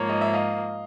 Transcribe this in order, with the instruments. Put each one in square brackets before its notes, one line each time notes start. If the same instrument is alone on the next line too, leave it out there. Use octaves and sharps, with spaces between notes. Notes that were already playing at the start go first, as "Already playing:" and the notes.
Already playing: [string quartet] G#2 F3 A#3 [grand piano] C#5
[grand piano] D#5
E5
D#5 F5